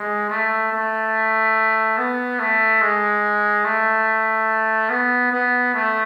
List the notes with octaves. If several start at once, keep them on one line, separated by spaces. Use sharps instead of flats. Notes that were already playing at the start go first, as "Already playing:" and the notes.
Already playing: G#3
A3
A3
B3
A3
G#3
A3
B3
B3
A3